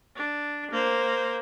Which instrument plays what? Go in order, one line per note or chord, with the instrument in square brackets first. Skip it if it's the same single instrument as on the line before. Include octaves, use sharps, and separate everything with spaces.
[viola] D4
A#3 C5